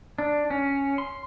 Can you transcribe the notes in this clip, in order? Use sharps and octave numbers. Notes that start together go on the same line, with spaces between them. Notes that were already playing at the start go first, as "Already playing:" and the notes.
D4
C#4
C6